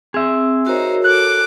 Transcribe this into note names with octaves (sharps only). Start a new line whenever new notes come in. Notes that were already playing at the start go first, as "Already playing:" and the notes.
C4 G#4 E5
D#4 F#4 A#4 C5 C#5
A4 D6 F#6